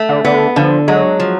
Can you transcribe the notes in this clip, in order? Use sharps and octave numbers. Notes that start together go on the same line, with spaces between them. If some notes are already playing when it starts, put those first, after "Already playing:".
Already playing: A3
D3
D3 B3
D3 F3
F#3 G#3
F3